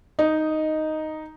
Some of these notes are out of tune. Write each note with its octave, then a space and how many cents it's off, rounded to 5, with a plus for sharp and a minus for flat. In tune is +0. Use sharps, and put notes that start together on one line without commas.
D#4 +0 D#5 -5